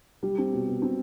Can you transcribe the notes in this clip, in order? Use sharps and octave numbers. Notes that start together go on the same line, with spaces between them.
G3
C4
B2
B2
C4